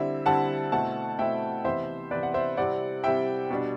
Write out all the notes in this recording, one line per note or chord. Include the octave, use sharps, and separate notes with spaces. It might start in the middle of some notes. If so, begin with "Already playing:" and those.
Already playing: D3 G3 C4 E4 E5
D3 G3 C4 E4 F#5 A5
B2 A3 C4 E4 F#5 A5
B2 A3 C4 E4 E5 G5
C3 E3 B3 C5 E5
C3 E3 B3 B4 D5
F#5
C5 E5
C3 G3 C4 E4 D5 F#5
C3 G3 C4 E4 E5 G5
B2 G3 D4